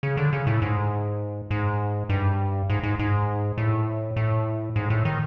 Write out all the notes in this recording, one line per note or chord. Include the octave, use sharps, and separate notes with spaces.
C#3
D3
C#3
A2
G#2
G#2
G2
G#2
G#2
G#2
A2
A2
G#2
A2
D#3